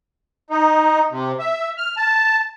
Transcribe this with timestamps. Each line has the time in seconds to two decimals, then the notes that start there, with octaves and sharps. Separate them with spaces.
0.50 D#4
1.11 C3
1.39 E5
1.78 F6
1.97 A5